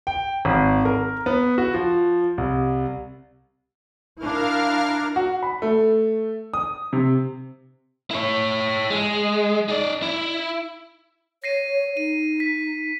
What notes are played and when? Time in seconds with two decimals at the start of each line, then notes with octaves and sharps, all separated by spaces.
0.07 G5
0.45 G#1
0.85 A#4
1.26 B3
1.58 F#4
1.74 F3
2.38 C2
4.19 D4 E4 A#4 F5 F6
5.16 F#4
5.43 B5
5.62 A3
6.54 D#6
6.93 C3
8.11 E4 C#5
8.90 G#3
9.69 D#4 D5
10.02 E4
11.44 C#5 A#6 C7 D#7
11.97 D#4 D#7
12.40 B6